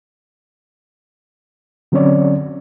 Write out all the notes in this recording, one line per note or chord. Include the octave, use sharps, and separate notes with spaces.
D3 F#3 C4 C#4 C#5 D5